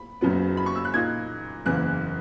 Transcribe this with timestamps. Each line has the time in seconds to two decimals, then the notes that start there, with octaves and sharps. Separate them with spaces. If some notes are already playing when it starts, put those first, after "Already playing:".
Already playing: B5
0.21 F#1 F#2 C#3 F#3 B3
0.57 B5
0.66 C#6
0.76 E6
0.85 F#6
0.93 A#2 A#3 D#4 G#6
1.65 F#1 E2 C#3 E3 A#3 F#6